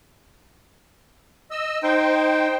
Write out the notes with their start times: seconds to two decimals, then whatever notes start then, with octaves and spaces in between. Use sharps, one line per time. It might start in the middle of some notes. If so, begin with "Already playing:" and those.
1.51 D#5 E6
1.83 D#4 C5 G5